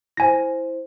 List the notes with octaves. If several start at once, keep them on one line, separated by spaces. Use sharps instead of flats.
E4 C5 G#5 A#6